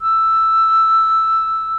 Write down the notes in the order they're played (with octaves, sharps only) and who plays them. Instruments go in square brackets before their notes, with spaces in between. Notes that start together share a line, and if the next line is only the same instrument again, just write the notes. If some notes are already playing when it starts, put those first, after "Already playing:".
[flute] E6